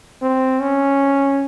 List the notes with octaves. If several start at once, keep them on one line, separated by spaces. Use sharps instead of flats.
C4
C#4